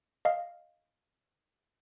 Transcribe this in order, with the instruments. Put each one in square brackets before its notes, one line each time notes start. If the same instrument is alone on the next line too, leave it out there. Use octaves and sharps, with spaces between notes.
[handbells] D#5 F5